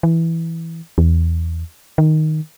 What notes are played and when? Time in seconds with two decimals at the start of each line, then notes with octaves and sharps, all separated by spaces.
0.03 E3
0.98 E2
1.98 D#3